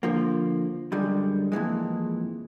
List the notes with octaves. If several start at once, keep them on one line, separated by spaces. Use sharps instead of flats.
D3 F3 A#3
F#2 D3 G3 G#3
F2 A#2 E3 G#3